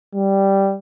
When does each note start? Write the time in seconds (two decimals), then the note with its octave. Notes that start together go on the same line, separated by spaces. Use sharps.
0.15 G3